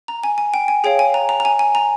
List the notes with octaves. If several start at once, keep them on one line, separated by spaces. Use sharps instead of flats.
A#5
G#5
G#5
G5
G#5
G#4 C#5 F5 G5
G#5
A#5
A#5
A#5
G#5
G#5
A#5